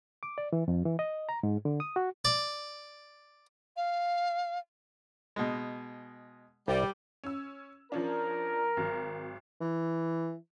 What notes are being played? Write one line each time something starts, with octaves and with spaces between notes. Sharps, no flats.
D6
D5
E3
F2
E3
D#5
A#5
G#2
D3
D#6
F#4
D5
F5
B2 G#3
C2 G3
C#4 E6
F3 C#4 D4 A#4
G#1 F#3
E3